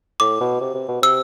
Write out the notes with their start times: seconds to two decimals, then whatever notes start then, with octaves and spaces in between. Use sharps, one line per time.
0.20 A2 D6
0.41 B2
0.61 C3
0.75 C3
0.89 B2
1.02 C3 E6